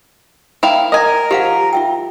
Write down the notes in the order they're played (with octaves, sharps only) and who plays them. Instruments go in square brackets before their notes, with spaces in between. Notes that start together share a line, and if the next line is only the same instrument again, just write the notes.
[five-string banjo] E4 A#4 F5 [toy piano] G5
[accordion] A#4 [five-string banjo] D#5 G#5
[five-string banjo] F3 [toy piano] G4 F5 F#5
[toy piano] F4 E5 G5